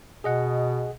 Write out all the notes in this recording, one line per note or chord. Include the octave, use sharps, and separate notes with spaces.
B2 G#4 D#5 F#5